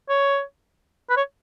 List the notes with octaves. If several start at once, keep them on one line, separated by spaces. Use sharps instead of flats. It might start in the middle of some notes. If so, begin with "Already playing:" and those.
C#5
B4
C#5